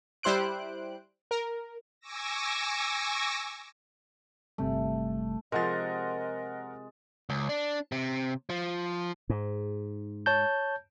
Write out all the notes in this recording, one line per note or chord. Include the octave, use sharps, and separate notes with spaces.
G3 E4 C5 F#6 D7
A#4
G#5 C#6 D6 E6 A#6
G1 C3 G3 A3
C3 F3 G#3 A#4 D#5 F#5 A6
C#2
D4
C3
F3
G#2
C#5 A5 G6